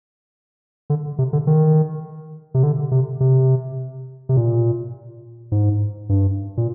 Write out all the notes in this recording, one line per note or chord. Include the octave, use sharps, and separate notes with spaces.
D3
C3
D3
D#3
C3
D3
C3
C3
C3
A#2
G#2
G2
A#2